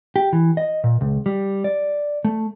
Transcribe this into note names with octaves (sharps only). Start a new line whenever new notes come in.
G4
E3
D#5
A#2
C#2
G3
D5
A3